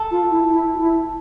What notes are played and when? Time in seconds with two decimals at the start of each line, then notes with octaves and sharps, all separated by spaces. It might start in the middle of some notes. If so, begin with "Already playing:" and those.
Already playing: A4
0.11 F4
0.31 E4
0.50 E4
0.74 F4
0.79 E4